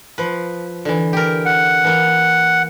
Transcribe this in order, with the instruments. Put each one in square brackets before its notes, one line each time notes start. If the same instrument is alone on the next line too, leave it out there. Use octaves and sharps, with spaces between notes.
[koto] F3 B4
D3 E3
G4 A#4
[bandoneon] F#5
[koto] E3 A#3